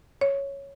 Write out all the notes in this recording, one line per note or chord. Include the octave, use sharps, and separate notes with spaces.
C#5